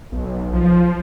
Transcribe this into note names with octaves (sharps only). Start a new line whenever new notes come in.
B1
F3